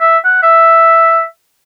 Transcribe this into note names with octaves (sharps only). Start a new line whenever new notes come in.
E5
F#5
E5